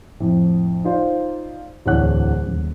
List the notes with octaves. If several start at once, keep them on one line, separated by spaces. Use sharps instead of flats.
F2 A2
D#4 F4 C5 D5
D1 E2 D4 C#5 F#5 F#6
D#1